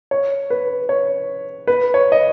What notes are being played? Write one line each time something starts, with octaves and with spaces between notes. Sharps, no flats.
C#5
B4
C#5
B4
C#5
D#5